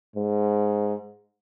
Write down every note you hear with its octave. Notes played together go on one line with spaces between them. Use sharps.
G#2